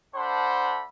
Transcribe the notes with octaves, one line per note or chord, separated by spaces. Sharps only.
A3 D4 C5 F#5 B5